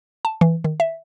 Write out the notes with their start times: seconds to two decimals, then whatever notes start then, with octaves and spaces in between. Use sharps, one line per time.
0.25 A5
0.41 E3
0.64 D#3
0.80 E5